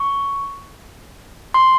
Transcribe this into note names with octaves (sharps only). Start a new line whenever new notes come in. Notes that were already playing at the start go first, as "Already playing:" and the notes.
Already playing: C#6
C6